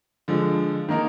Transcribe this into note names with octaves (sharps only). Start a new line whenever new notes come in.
D3 F3 G#3
D#3 A#3 D#4 A#4